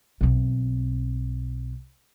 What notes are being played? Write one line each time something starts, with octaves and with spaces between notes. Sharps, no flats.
B1 C4